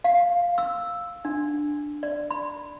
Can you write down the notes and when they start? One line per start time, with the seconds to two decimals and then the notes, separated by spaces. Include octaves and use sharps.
0.04 F5
0.58 E6
1.25 D4
2.03 D5
2.31 B5